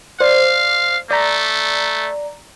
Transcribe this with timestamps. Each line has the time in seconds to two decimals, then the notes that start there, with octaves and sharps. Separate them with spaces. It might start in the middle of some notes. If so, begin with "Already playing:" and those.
0.20 C5 D5 F5
1.11 A3 D5 A#5